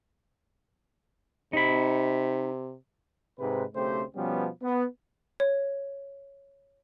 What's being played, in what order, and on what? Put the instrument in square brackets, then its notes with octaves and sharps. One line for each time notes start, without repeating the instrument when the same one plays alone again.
[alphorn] C3 [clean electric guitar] D#4 B5
[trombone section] G#2 C3 B4
B1 C#3 A3 C4 G4 C5
B2 F3 G3 B3 C#4
B3
[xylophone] C#5